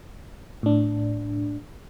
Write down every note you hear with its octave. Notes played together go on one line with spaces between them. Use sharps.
A2 D4